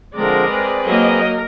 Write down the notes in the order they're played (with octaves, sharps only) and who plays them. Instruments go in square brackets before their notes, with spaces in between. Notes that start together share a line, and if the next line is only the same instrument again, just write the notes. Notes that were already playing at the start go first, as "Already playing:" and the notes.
[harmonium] D3 F3 C4 [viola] G#3 A#4 [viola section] D5
[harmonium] C4 G#4 B4
[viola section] F#3 A#3 D#5 [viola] A#4